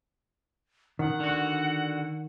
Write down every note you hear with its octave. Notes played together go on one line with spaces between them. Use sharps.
D#3 F#5
D3 F#4